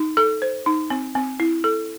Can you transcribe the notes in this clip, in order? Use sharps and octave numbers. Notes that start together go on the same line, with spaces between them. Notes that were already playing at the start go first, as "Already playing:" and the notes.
Already playing: D#4
A4
C5
D#4
C4
C4
E4
A4